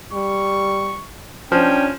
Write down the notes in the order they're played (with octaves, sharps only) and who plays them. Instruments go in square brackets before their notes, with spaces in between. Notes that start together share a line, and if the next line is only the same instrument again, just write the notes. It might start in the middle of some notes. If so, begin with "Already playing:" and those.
[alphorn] G3 [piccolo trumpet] C#6
[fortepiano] F3 [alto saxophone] C#4 [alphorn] D4 [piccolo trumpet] G5